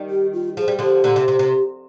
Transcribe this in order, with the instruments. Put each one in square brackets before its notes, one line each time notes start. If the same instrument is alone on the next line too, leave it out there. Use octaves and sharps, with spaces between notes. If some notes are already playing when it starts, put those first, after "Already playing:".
Already playing: [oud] D#3 G3
[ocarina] G4
F4
[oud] F3 [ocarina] G#4
[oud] G3
[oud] D3 F3 [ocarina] G4
[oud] A#2 D3
C3
C3
C3